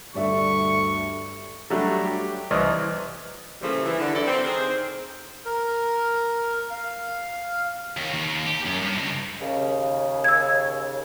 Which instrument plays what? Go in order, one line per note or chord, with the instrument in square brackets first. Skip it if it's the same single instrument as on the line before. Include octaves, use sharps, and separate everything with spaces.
[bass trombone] D2 [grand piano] G2 D5 E5 [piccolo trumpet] C#6
[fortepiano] F#3 G3 A3 D4
G4
C2 E3 D5 D#5 F6
[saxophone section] A#2 C#3 E3 F3 G3 A3
E3
D3
G2 D3 F#3 E4 A4 D5
C4
D#3 C4 G#4 A#4 C5
[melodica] A#4
F5
[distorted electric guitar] D#2
D#2
G4
F#2
G2
C#2
[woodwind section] D#2 C#3
[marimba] E6 G#6